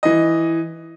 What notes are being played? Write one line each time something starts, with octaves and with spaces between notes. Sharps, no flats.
E3 D#5